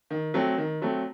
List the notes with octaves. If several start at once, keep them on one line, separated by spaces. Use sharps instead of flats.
D#3
F#3 A3 C4
D#3
F#3 A3 C4